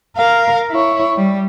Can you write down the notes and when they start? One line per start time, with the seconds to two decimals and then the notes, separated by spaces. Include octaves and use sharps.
0.17 A#4 F5
0.71 E4 C#5
1.17 G3